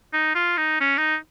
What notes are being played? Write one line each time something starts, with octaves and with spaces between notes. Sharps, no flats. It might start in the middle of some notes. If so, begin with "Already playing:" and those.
D#4
F4
D#4
C#4
D#4